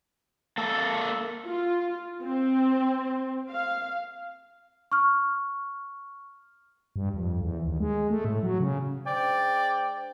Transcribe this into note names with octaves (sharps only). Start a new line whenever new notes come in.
A#3 A4
F4
C4
F5
C#6 F6
G2
F2
E2
D#2
G#3
A3
A2
F#3
C#3
G#3 D4 C5 D5 G5